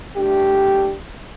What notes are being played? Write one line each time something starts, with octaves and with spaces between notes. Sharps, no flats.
A3 D4 G4